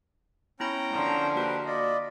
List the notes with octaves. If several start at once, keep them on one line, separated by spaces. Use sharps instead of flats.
B3 C#4 E4 G5 A#5 B5
D3 F3 A#4
A#3 F#4 G4 B4 C5
F4 D5 D#5 B5